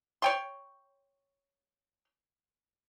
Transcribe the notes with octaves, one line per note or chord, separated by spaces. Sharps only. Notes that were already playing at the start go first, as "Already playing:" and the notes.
C#5 G5 C6